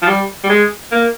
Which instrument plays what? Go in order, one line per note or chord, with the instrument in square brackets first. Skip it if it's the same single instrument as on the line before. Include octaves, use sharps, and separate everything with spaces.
[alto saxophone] F3
G3
G3
G#3
A#3